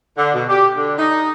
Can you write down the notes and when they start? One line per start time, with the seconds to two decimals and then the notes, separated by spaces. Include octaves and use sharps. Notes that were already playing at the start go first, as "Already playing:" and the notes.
0.18 D3
0.34 B2
0.49 G4
0.76 D3
0.98 D#4